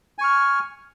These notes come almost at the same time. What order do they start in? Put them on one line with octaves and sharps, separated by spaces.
G#5 C#6 F6